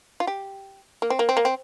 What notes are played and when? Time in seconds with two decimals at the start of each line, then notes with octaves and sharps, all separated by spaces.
0.20 F4
0.27 G4
1.02 A#3
1.10 C4
1.19 A#3
1.29 C4
1.37 A#3
1.45 C4